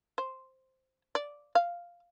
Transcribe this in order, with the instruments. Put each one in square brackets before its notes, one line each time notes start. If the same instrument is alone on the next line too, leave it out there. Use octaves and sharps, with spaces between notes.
[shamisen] C5
D5
F5